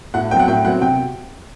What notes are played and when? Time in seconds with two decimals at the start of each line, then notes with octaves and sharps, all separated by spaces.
0.14 A2 F#5
0.31 F#3 C4 G5
0.39 F#5
0.48 A2 G5
0.65 F#3 C4 F#5
0.81 C3 G5